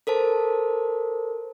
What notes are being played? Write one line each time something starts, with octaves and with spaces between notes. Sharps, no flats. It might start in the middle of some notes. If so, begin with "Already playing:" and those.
A4 A#4 C5 A5